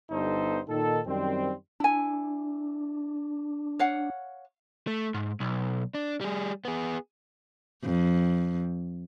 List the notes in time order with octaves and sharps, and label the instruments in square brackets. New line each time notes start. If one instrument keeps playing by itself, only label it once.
[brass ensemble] G1 G2 B3 D#4 A4 C5
A#2 D#3 D#4 A4
F#2 D#3 G3 C4
[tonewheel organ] D4 [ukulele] E4 G#5
[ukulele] C#5 F5 F#5
[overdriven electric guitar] A3
G#2
B1
D4
G3 G#4
B3 G#4
[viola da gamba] F2